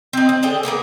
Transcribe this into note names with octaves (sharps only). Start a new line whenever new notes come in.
C4 D#4
C4
D3 G#4 G5
A#3 B3 G#4 A#4